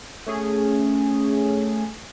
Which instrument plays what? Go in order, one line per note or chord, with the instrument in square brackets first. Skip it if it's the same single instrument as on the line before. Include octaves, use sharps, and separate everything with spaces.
[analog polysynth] A3 C#4 G#4